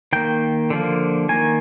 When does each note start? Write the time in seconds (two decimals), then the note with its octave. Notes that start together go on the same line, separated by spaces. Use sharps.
0.13 D#3 A#3 G5
0.70 D3 F3 A#3
1.29 D#3 A#3 G#5